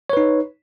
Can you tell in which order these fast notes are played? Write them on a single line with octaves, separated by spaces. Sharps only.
C#5 B4 D#4